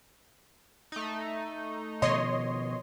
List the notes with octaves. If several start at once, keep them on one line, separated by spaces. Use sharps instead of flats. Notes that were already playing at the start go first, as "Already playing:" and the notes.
A3 D#4
B2 D#3 F3 C#5 D#5 C6